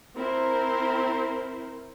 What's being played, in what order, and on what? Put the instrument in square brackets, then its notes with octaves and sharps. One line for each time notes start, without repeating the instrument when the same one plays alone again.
[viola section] C4 E4 A#4 C5